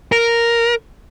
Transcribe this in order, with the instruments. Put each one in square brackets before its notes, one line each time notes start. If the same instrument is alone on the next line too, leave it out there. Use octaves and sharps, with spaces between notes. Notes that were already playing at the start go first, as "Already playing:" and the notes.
[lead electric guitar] A#4